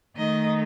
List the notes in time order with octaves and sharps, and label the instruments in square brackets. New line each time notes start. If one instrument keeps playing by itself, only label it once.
[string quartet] D#3 A3 D#4 D#5